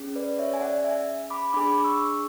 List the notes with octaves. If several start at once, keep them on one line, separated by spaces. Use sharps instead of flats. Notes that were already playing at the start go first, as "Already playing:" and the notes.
Already playing: C#4 G#4
B4 D5
C#5 E5
G#5
D5 F#5
E5 G#5
B5 D6
D4 G#4 B5 D6
D6
C#6 E6